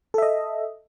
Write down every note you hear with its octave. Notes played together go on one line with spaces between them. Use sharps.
A4 D#5 E5